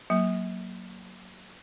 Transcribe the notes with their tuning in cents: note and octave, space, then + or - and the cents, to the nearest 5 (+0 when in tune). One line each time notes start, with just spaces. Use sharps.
F#3 +0 A#3 -5